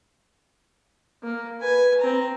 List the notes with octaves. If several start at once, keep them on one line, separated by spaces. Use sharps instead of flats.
A#3
B4 G#5
C4 A#5